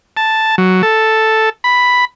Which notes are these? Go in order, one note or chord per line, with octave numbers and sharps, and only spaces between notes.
A5
F#3
A4
B5